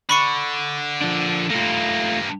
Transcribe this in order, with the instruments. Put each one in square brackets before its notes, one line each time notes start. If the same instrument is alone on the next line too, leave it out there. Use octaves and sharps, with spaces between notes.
[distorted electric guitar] D3 [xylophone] B5 C#6 C#7
[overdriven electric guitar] F3 D4
[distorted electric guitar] G2 A#3 [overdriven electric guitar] A3 F4